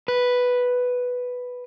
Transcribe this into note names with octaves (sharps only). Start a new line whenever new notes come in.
B4